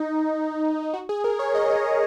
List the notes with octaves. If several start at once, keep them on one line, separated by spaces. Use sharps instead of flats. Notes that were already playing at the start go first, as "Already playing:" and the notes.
Already playing: D#4
D#4
F#4
G#4
A#4
C#5
D#5
C#5
C#5